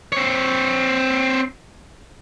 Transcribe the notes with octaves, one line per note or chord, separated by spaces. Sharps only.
C4 C#5